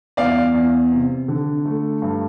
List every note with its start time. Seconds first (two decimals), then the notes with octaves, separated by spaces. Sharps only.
0.17 E2 D5 F5
0.54 E2
0.91 C3
1.28 D3
1.65 A3
2.02 G2